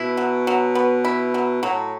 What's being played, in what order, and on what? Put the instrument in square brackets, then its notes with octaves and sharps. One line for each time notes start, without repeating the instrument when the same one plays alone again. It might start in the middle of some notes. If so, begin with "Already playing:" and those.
Already playing: [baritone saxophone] B2 [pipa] E4
[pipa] F#3
F#3
B3
E4
F#3
[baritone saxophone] A2 [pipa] F#3